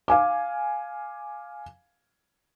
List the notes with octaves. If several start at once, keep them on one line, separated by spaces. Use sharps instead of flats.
F5 G#5 D6